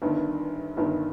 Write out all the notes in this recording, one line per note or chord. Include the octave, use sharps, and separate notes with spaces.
G1 G2 D#3
G1 G2 D#3